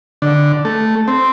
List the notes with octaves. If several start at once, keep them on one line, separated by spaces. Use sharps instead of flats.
D3
A3
C4